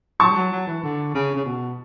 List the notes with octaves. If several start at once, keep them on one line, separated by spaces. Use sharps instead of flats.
F#3 A5 C#6
G3
F#3
F#3
E3
D3
C#3
C#3
B2